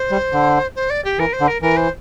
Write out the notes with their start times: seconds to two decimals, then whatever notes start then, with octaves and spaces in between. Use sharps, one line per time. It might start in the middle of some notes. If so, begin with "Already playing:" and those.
Already playing: C5
0.11 G3
0.33 D3
0.75 C5
0.90 D5
1.04 G4
1.19 E3 A#4
1.32 C5
1.40 D3
1.47 A#4
1.61 E3 A#4
1.76 C5